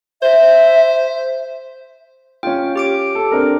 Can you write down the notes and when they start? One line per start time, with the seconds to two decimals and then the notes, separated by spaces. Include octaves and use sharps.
0.22 C5 E5
2.43 C#4 F4 G5
2.76 G4 D6 D7
3.15 A4
3.32 C4 D4 A#4